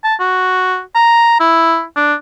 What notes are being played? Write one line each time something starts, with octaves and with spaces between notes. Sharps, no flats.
A5
F#4
A#5
E4
D4